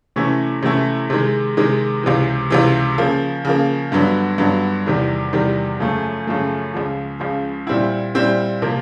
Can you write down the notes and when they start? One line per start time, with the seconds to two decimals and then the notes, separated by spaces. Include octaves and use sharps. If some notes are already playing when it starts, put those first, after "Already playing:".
0.16 C3 E3 A3 C#4 E4
0.62 C3 E3 A3 C#4 E4
1.10 C3 D#3 G#3
1.57 C3 D#3 G#3
2.03 C#2 C3 E3
2.50 C#2 C3 E3
2.98 C#3 F3 A#3
3.45 C#3 F3 A#3
3.92 G2 D3 F#3 B3
4.38 G2 D3 F#3 B3
4.86 E2 C3 D#3 G3
5.33 E2 C3 D#3 G3
5.80 F#2 C#3 F3 A3
6.27 F#2 C#3 F3 A3
6.74 C#2 C#3 F3
7.20 C#2 C#3 F3
7.67 A#2 G3 C4 E4
8.15 A#2 G3 C4 E4
8.62 C3 F3 A#3